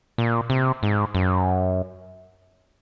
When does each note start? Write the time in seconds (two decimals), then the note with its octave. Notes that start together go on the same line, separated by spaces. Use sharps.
0.18 A#2
0.50 C3
0.83 G#2
1.15 F#2